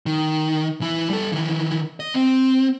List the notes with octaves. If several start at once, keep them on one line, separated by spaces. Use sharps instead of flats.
D#3
E3 E4
G3 A4
D#3 E3
D#5
C4